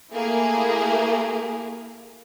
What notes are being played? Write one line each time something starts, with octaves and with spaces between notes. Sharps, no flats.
A3 A#3 E4 G4 G#4 A#4